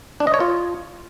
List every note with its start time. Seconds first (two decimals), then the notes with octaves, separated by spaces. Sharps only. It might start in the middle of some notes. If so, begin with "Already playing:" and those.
0.20 D4
0.27 D#5
0.34 C#5
0.40 F4